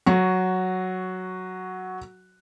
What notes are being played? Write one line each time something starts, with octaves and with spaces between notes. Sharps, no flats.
F#3 F#4